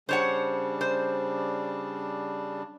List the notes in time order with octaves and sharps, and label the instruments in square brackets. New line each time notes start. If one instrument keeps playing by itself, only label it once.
[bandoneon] C#3 G3 D4 [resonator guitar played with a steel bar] C5 C#5 F#5
[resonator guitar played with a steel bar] C5